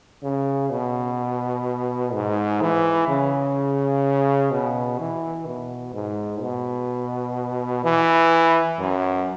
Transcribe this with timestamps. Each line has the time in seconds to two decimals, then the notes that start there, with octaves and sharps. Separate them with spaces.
0.23 C#3
0.70 B2
2.14 G#2
2.61 E3
3.08 C#3
4.51 B2
4.99 E3
5.46 B2
5.94 G#2
6.41 B2
7.84 E3
8.79 F#2